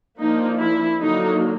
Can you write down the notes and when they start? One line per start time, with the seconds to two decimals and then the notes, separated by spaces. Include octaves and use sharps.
0.18 F3 A#3 D4 D#4
0.59 E4
0.99 D3 F#3 A#3 D#4